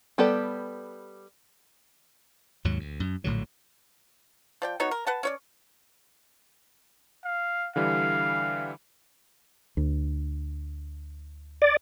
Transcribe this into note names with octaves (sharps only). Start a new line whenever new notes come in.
G3 B3 G4 A4 D5
D#2 G#2 F#3
D2
F#2
A#1 A2 D3 F#3
F3 D5 G5
B3 D#4 F#4 C#5
A#4
B4 F#5 A5
C#4 C#5 D5
F5
D3 E3 G3 F5
D2
D5